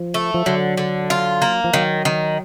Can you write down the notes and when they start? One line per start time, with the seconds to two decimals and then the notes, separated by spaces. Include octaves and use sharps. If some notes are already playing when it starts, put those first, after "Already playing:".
Already playing: F3
0.14 A3
0.34 F3
0.46 D3 F#3
0.77 D3
1.10 F4
1.42 A#3
1.64 F3
1.74 D#3 F#3
2.05 D#3